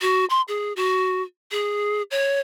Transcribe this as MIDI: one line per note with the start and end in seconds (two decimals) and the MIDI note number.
0.02 0.25 66
0.30 0.41 84
0.48 0.73 68
0.76 1.22 66
1.51 2.02 68
2.11 2.40 73